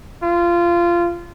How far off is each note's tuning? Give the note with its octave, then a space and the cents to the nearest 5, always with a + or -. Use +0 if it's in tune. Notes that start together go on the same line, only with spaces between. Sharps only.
F4 -20